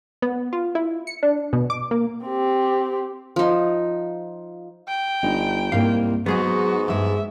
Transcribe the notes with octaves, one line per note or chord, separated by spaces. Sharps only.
B3
F4
E4
C#7
D4
B2
D6
A#3
C4 G4
F3 D#4
G5
G1 D#4
C2 G#2 A#3 F5
G#2 F#3 B3 D#4 F#4 G#4
G2 G#3 E5